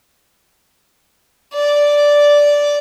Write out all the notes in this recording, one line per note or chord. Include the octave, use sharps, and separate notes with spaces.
D5